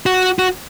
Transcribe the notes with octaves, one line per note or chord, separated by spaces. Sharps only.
F#4
F#4